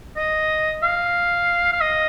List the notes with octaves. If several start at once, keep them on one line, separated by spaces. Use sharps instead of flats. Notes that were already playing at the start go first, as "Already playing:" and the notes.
D#5
F5
F5
D#5